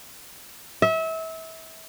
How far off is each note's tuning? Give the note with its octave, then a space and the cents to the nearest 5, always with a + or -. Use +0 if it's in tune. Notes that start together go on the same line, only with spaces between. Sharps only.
E5 -30